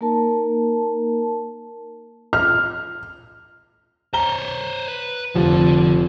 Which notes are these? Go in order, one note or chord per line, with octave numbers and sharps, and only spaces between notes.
A#3 D#4 A#4 A5
F6
C5 C#5 A#5 G7
B4
F1 D3 F3